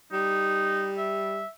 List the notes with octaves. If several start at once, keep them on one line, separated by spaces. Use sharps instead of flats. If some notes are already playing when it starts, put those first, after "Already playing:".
G3 D#4
E5